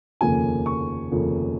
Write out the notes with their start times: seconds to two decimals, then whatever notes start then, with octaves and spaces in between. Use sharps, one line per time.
0.21 F1 D#2 C#3 F3 A#3 G#5
0.66 C#6
1.11 F1 D#2 C#3 F3 A#3